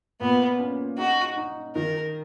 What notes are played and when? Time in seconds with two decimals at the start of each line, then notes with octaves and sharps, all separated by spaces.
0.21 A#2 B3
0.59 C#4
0.98 D#4 F#4
1.37 D#4
1.75 D#3 A#4